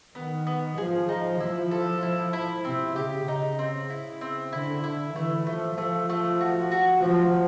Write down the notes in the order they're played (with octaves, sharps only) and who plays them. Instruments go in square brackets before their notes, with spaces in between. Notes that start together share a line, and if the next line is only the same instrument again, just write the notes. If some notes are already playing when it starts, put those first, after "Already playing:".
[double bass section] D#3 [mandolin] B3
[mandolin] B3
[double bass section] F3 [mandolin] G#4
[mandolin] D#4
[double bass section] F3 [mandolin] E4
[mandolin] A4
E4
E4
[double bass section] C3 [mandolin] C4
[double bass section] C#3 [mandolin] G4
[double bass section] C#3 [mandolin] D#4
[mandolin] C4
E4
C4
[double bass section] D3 [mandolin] E4
[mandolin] E4
[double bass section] E3 [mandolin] A3
[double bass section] F3 [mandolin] A3
[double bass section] F3 [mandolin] A3
[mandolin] A3
F#4
F#4
[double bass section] F3 [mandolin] F#4